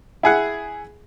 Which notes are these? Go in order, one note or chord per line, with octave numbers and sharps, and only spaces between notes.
E4 G#4 F#5